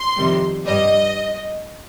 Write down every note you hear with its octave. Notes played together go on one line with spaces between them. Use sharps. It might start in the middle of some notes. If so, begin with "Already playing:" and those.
Already playing: C6
F2 C3 D#3 G3
G2 G3 D#5